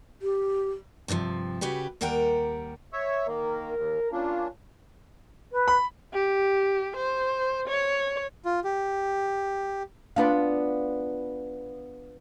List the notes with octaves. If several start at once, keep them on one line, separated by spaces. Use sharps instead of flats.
G4
G2 C3 D#3 F3
C#3 C#4 F#4 G4 B4
D#2 G3 A#4 F#5 G5 A#5
C#5 E5
D#3 A#3 A#4
D#2
A#3 C#4 D4 F4
B4
B5
G4
C5
C#5
F4
G4
B3 D4 F4